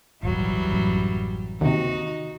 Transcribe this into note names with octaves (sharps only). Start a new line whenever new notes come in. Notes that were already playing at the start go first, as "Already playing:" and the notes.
D#1 G#1 E3 F#3 G3
A1 F#2
D#2 C3 D#4 F#4